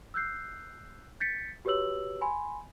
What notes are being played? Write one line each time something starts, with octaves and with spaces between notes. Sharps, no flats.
E6 F#6 G6 C7
G6 A6 B6 C#7
F#4 G4 B4 C#5 E6 F#7
G#5 B5 C6